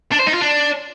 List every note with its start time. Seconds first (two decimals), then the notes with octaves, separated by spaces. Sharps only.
0.12 D4
0.19 C5
0.27 D#4
0.34 F4
0.41 D4